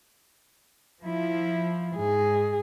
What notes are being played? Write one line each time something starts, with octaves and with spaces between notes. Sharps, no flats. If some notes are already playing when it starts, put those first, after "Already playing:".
F3 E4
G#2 G#4